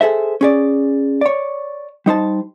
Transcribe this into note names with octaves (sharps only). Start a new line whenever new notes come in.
G#4 A4 C5 E5
C#4 G#4 D5
C#5 D5
G3 D#4 C5 A5